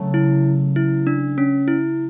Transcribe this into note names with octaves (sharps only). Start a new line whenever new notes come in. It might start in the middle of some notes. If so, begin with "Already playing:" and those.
Already playing: C#3 F#3 A3
E4
E4
D4
C#4
E4